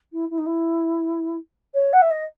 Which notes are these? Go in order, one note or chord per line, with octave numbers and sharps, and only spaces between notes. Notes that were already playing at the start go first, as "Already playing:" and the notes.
E4
E4
D#4
E4
C#5
F#5
E5
D#5